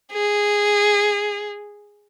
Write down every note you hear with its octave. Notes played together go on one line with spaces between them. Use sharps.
G#4